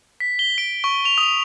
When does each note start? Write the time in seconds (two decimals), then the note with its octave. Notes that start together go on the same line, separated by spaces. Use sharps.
0.20 B6
0.39 G7
0.58 D7
0.84 C#6
1.05 F7
1.18 D#6